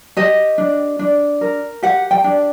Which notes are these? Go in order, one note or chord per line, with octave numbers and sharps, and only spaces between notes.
G4 D#5
D4
D4
A#4
G4 F#5
G5
D4